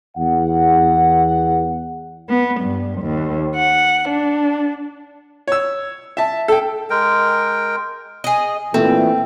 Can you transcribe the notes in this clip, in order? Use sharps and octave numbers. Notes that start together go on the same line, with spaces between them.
E2 F#5
B3
G2
D#2
F#5
D4
C#5 E6
E5 A5
A4 G5
G#3 A#4 G5
G#4 D#5
A#2 E3 A3 C4